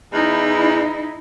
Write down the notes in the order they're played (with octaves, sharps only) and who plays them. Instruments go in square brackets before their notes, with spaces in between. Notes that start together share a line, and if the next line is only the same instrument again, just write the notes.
[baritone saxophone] E2 [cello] D#4 E4